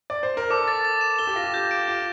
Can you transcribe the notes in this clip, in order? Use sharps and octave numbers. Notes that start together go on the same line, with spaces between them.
D5
C5
A#4
A4 D6
A6
A6
E7
A4 G7
G4
F4 A#6
G4
G6
D7
F4 G6